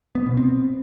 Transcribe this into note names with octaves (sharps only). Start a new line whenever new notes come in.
B3
B2
C4